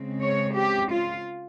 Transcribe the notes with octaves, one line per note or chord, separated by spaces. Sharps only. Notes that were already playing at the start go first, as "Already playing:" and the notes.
Already playing: C#3 G#3 C4
C#5
G4
F4